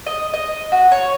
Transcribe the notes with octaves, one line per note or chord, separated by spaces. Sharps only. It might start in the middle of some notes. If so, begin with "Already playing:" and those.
D#5
D#5
F#4
C#5